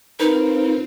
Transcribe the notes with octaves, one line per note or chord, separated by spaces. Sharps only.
C4 D#4 F4 A#4 B4